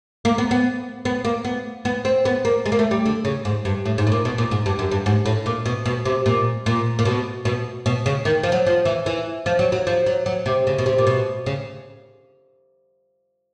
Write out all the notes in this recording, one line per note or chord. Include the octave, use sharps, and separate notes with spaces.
A#3
B3
B3
B3
A#3
B3
B3
C4
B3
A#3
G#3
A#3
A3
G3
D3
C#3
G#2
G2
A2
G#2
A2
A#2
B2
A#2
G#2
G2
F#2
G2
G#2
A2
A#2
B2
B2
C3
A#2
A#2
A#2
B2
B2
B2
C#3
D#3
F3
F#3
F3
E3
E3
F3
F#3
F#3
F3
F#3
F#3
C3
C#3
B2
C3
A#2
B2
C#3